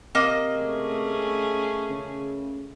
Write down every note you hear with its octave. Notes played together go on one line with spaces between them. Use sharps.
C3 A#3 D#5
A3 C#4 G#4
C#3